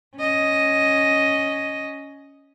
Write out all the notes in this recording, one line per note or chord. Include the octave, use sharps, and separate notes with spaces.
C#4 D#5